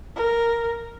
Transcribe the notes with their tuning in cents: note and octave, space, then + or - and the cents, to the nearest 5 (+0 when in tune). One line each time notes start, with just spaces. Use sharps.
A#4 +0